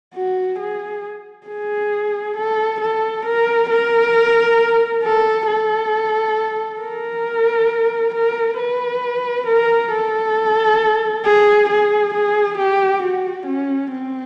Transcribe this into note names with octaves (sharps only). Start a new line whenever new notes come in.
F#4
G#4
G#4
A4
A4
A#4
A#4
A4
A4
A#4
A#4
B4
A#4
A4
G#4
G#4
G#4
G4
F#4
C#4
C4